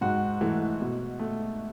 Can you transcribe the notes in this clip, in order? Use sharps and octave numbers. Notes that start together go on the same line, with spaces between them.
G#2 F#4
E3 A3
B2
A3